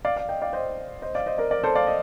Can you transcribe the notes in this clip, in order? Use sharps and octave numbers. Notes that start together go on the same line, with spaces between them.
D5 F5
D5 F5
D#5 G5
D5 F5
C5 D#5
C5 D#5
D5 F5
C5 D#5
A#4 D5
A#4 D5
A4 C5
D5 F5
D#5